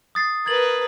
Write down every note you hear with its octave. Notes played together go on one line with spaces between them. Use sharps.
D#6 A6 C7
A#4 B4 G#6 A6 F#7